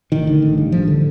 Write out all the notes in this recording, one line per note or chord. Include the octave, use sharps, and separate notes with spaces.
A1 D#3
D3
A1
G2
A1 F3
D3